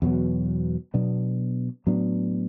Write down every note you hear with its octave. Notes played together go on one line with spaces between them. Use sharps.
E2 B2 F#3 B3
B2 F#3 B3 D4
A2 F#3 B3 D4